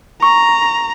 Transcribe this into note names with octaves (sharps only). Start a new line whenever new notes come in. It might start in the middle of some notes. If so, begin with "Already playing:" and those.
A#5 C#6